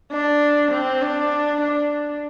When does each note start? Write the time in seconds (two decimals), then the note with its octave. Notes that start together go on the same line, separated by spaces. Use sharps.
0.12 D4
0.71 C4
1.02 D4
1.61 D4